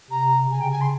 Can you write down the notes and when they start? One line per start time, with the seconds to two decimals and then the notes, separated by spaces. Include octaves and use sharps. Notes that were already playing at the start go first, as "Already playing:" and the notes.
0.10 C3 A#5
0.51 C#3 G#5
0.60 G5
0.71 G#5
0.81 C6